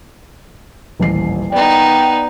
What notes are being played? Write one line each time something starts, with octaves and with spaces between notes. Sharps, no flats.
D#1 A1 C7
B3 D#4 D5 G5